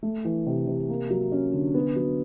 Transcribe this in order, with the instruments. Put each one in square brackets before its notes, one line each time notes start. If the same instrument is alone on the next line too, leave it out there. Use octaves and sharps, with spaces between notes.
[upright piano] A3
E3
C3
C3
A#3
F#3
C#4
D3
B3
F#3